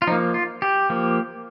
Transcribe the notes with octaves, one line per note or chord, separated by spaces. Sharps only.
F4
F3 A#3 D#4
F4
G4
F3 A#3